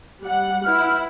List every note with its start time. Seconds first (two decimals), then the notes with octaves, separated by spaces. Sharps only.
0.23 G3 F#5
0.65 E4 B4 F#5 F6